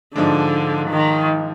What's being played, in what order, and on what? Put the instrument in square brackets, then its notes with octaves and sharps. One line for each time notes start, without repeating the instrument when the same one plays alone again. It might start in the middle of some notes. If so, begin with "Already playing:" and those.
[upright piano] G#2 F3 G#3 D4 [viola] D3
[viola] D#3